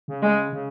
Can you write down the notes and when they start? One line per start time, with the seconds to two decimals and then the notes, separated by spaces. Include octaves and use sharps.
0.08 C#3
0.22 G#3
0.53 C#3